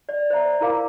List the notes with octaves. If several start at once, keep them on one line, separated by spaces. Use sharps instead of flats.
D5
C5 D5 E5 A#5
E4 F4 A#4 F5 D6